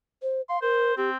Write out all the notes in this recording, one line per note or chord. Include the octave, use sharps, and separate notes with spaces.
C5
F5 C6
A#4 C5
C4 G4